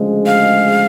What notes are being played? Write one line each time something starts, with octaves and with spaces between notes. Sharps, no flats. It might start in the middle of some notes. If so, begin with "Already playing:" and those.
Already playing: D2 C#3 F3 G#3
F5